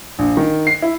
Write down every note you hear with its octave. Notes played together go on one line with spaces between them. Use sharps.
A#1
D#3
C7
E4